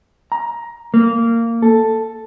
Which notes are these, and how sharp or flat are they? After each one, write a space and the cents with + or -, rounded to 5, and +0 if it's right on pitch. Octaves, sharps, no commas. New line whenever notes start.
A#5 +15
A#3 -15
A4 +5